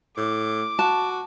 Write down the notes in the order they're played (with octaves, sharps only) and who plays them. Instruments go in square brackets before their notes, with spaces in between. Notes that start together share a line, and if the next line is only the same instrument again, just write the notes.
[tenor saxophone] A2 [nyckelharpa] D6
[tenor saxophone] F#4 [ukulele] A5